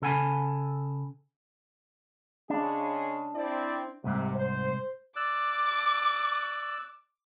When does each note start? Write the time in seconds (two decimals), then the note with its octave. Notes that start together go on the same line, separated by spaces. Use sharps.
0.02 C#3 A4 F#5 G#5 B5
2.50 C#3 G#3 D4 G#4
3.35 C4 E4 D5
4.04 C2 G#2 C3
4.35 C5
5.16 D5 D6 E6 F#6